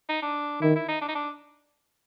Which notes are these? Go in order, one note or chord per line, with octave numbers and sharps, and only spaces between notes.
D#4
D4
D#3 E4
E4
D#4
D4
D#4
D4